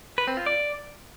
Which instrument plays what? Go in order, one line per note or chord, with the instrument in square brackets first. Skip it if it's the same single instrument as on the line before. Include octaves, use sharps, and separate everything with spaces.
[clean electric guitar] B4
C4
F4
D5